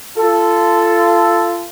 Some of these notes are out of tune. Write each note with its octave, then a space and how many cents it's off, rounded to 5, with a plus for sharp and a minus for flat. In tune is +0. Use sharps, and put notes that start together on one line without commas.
F4 -25 A4 +0